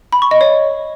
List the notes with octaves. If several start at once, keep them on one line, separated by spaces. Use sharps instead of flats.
B5
C#6
D#5
C#5